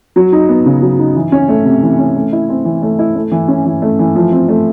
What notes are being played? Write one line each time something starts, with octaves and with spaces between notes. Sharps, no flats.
F#3
D#4
B3
C#3
F#3
D#4
E3
C#4
A3
C3
E3
C#4
A3
E4
C4
E3
A3
E4
A3
E3
C#4
E3
A3
E3
F3
C4
A3